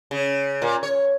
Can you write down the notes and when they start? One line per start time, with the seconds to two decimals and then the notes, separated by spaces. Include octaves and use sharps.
0.11 C#3
0.62 A#2
0.83 C#5